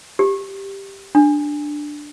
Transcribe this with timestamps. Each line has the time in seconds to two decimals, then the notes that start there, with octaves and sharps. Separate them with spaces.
0.19 G4
1.15 D4